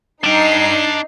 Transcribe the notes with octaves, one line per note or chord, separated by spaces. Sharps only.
D4 D#4 G5 C7